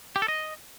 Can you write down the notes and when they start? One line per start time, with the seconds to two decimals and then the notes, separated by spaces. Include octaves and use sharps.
0.16 G4
0.22 A4
0.28 D#5